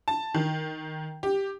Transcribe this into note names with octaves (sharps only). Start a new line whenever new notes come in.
A5
D#3
G4